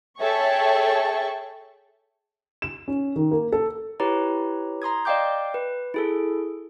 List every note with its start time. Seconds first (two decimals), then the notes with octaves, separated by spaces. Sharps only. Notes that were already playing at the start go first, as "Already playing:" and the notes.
0.20 G#4 A4 C#5 E5 G5 C#6
2.62 E7
2.88 C#4
3.16 D#3
3.31 A#3
3.52 A4
4.00 E4 G4 B4 C#5 A#5
4.82 A#5 C6 D#6 G#6
5.05 D5 D#5 F5 G5 D6 G6
5.54 B4
5.94 E4 G#4 A4